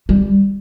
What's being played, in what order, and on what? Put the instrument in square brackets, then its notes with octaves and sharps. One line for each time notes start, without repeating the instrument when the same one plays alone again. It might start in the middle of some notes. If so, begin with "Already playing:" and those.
[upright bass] G3